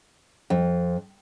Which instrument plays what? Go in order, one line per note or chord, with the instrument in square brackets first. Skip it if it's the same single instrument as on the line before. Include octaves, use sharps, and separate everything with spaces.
[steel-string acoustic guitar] F2